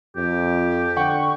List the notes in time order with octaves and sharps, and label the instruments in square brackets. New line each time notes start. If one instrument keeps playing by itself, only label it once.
[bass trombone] F2 [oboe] G4
[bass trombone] D3 [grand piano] F#5 G5 [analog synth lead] C#6